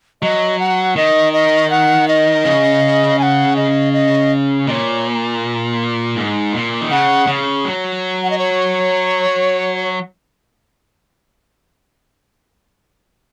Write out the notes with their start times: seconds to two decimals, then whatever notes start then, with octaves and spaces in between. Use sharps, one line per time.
0.22 F#3 D#5
0.59 F#5
0.96 D#3 D#5
1.33 D#5
1.70 F#5
2.08 D#5
2.45 C#3
3.19 G#5
3.23 F#5
3.56 D#5
3.93 D#5
4.67 A#2 D#5
4.71 C#5
6.16 G#2
6.53 A#2
6.81 D#3
6.90 C#3 F#5
7.27 C#3
7.65 F#3
8.23 F#5
8.30 D#5
8.38 C#5